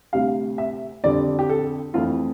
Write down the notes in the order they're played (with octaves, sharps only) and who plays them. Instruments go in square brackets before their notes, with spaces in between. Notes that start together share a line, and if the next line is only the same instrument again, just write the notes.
[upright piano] D2 C3 G3 F5
E5
F2 D3 G3 D5
G4
A4
F2 E3 A3 F4